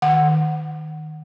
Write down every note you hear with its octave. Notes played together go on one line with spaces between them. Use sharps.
D#3 F#5